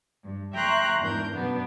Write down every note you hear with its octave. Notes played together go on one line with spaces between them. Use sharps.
G2
E5 G5 A#5 C6 C#6 F#6
E2 G#2 D4 A#4 G6
F#2 B2 B3 D4